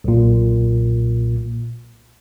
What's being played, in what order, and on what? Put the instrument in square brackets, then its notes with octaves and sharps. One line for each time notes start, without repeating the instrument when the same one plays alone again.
[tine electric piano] B1 A#2